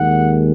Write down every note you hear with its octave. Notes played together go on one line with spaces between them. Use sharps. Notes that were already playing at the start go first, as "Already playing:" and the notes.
Already playing: D#2 D#3 G#3 F#5